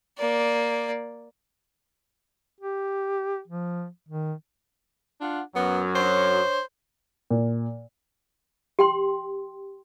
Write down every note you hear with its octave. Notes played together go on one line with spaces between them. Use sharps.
A#3 D5
G4
F3
D#3
D4 F4 F#5
F#2 F#3 B3
D4 C5 C#5
A#2
G4 G5 C6